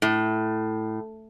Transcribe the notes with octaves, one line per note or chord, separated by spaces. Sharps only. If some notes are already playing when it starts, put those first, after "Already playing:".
A2